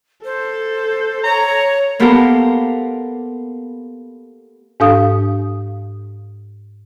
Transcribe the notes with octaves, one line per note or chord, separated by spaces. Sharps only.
A4 C5
C#5 A#5
A#3 B3 G4 A4 A#4 C5
G#2 D4 A4 F5 D#6